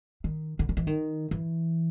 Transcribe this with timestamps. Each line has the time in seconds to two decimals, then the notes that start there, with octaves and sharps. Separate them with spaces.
0.24 D#3
0.59 D3
0.69 D#3
0.77 E3
0.87 D#3
1.31 E3